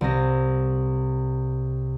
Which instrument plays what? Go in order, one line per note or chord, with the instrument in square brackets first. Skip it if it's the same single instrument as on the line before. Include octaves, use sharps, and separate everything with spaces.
[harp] C2 A#6